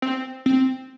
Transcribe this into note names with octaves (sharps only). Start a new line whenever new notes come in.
C4
C4